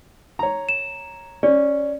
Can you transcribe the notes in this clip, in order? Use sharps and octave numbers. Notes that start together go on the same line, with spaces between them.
C#5 A#5
E7
C#4 D5